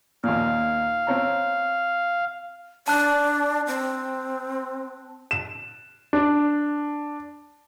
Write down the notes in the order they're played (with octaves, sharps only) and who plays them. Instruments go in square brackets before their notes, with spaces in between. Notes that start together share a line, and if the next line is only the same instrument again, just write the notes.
[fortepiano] D#2 A#2 [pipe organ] F5
[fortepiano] C4 C#5 A#5
[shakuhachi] D4 [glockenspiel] A5 F#6
[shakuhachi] C4
[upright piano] E7
D4